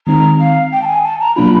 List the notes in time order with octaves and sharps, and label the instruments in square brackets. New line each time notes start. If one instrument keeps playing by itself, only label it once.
[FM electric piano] D#3 G#3 C4 D#4 [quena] A#5
[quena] F5
G5
A5
G#5
A5
A#5
[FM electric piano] B2 F#3 A#3 D4 F4 [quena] B5